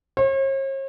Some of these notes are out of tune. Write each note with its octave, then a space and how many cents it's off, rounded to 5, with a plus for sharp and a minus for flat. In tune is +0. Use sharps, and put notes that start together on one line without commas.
C#5 -45